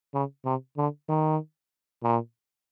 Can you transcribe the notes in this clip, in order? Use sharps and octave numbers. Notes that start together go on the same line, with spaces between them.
C#3
C3
D3
D#3
A#2